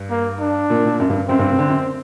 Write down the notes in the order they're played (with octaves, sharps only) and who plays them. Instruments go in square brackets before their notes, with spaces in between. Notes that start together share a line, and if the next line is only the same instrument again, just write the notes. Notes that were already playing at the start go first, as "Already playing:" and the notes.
Already playing: [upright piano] G2
[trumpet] A#3
D4
[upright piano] A#2
A#2
F#2
G2
[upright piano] F#2 [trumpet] C4
[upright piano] G2
C3
D3
F#2